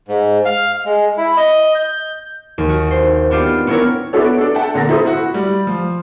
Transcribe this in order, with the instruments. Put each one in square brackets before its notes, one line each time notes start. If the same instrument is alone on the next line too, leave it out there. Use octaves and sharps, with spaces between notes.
[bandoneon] G#2
F5
G#3
E4
D#5
G6
[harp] D#2
F#4
C5
B3 D4 F4 G4
B3 C#4 D4 E4 A#4 C#5
[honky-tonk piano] B3 D4 E4 F#4 A4 C#5
D7
D4 A4
E5 F#5 G5 A5
A#2 D3 A#5 A#6
E4 F4 A4 C5 A#5 D#6
[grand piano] E4 F#4
G3
F3